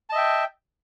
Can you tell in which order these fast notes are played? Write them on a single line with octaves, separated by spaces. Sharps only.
A5 D#5 E5 G5